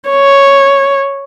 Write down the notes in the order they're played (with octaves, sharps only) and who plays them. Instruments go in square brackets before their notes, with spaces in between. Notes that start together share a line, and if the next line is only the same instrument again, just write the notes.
[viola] C#5